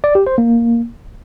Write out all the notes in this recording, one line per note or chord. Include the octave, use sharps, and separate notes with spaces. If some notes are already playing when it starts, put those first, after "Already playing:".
D5
G4
C5
A#3